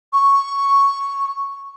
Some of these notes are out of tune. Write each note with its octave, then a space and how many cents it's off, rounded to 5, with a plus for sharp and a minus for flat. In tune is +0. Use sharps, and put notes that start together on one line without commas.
C#6 +0